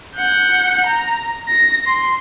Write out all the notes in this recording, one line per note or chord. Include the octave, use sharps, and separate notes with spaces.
F#5 G6
A#5
A#6
C6